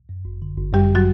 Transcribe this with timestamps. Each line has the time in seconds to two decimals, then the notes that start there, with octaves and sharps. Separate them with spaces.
0.09 F#2
0.25 G1
0.42 D3
0.58 G1
0.73 F#2 G3 G4
0.95 F#3 F#4